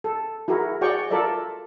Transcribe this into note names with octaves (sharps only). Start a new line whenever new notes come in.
A4
E4 F#4 G#4 A#4
F#4 G#4 C#5 D5 G5 C#6
F4 A4 A#4 D5 E5